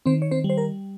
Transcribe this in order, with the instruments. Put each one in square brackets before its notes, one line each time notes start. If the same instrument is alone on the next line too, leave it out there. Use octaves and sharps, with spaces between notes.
[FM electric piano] D#3 C4 C5
C#5
C4 C5
G3
C5
A#4